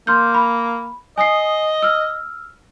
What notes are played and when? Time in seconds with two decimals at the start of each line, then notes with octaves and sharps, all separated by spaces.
0.07 A#3 C6 F6 G6
0.34 B5
1.18 D#5 G#5 D#6 C7
1.83 E6 F6